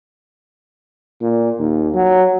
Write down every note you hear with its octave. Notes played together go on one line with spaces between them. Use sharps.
A#2
D#2
F#3